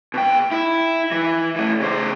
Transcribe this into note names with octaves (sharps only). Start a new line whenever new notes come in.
B2 G5
E4
E3
E3 A3
C#3 C5